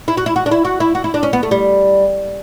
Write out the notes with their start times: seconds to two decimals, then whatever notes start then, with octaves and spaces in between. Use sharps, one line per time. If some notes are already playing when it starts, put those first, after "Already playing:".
0.08 E4
0.17 F#4
0.26 E4
0.36 F#4
0.46 D4
0.51 E4
0.65 F#4
0.80 E4
0.95 F#4
1.04 E4
1.14 D4
1.23 C#4
1.33 B3
1.43 A3
1.51 G3